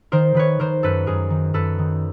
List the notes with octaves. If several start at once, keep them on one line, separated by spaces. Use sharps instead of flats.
D#3 A#4 C5
D#3 B4 C#5
D#3 A#4 C5
F#2 A4 B4
F#2 G#4 A#4
D#3
F#2 A4 B4
D#3